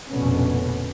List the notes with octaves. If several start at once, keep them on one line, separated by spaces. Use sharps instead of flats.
F1 A#1 B2 D3 B3 C#4